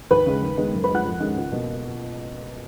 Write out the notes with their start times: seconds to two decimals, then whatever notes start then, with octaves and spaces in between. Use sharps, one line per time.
0.11 D#2 B4 B5
0.26 C#3 G#3
0.42 D#2
0.58 D#3 G#3 B3
0.73 F#2
0.84 B4 B5
0.89 G#3
0.94 F3 F#5 F#6
1.04 F2
1.20 D#3 G#3 C#4
1.36 C#2
1.52 B2 A#3